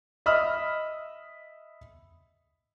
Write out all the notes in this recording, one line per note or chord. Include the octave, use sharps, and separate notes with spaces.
D#5 E5 B5 D#6 F6